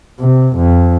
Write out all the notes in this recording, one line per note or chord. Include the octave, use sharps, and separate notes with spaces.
C3
F2